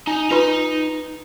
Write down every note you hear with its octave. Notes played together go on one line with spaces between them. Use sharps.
D#4 G#5
D#4 F4 B4 A#5 C6